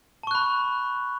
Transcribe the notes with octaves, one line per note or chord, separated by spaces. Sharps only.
A5 B5 C#6 F#6